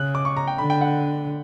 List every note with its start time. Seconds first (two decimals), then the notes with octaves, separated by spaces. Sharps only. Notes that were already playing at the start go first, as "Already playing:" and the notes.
Already playing: C#3 F#6
0.15 D6
0.25 C#6
0.37 A#5
0.47 G5
0.58 D3 B5
0.70 G5
0.81 F#5